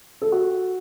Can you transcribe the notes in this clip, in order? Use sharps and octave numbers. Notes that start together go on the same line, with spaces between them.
A4
F#4